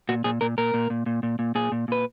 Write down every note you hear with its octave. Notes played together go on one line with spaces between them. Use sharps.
A#2 F#4
A#2 G#4
A#2 A#4
A#2 A#4
A#2
A#2
A#2
A#2
A#2
A#2 G#4
A#2
A#2 B4